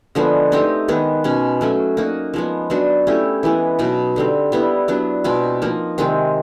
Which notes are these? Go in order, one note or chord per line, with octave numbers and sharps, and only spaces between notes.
D3 F3 G#3 B3
A3 C4 D#4 G4
D#3 G#3 B3
B2 G#3 C#4
F#3 A3 C#4 F#4
A#3 D#4 F#4
F3 G#3 B3
F#3 B3 D4 F#4
A3 C#4 E4 G4
E3 G#3 B3
B2 F#3 B3 D#4
D3 G3 C4
G3 B3 E4
F#3 B3 D4
B2 G#3 C4 F4
F3 A#3 D#4
C3 D#3 G#3 C4